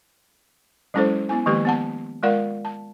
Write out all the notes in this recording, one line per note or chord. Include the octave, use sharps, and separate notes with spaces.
F#3 G#3 C#4 E4 A4 C5
B3 E4 G#5
D#3 F3 G#3 A#3 G4 B4
B3 F#5 A5
G#3 F4 A#4 D5 F5 F#5
A5